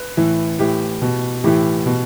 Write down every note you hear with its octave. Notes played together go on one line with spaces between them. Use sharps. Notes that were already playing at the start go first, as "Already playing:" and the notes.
Already playing: B4
A2 E3
A2 E3 G4
B2
A2 E3 G4
B2